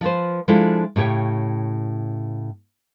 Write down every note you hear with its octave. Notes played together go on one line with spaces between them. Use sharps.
F3 F4 B4 C5
F3 G#3 D4 E4 F4 A4
A2 C#3 G4 C#5 G5